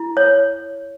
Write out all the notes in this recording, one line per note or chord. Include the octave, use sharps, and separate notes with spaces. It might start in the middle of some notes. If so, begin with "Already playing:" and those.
Already playing: E4
C#5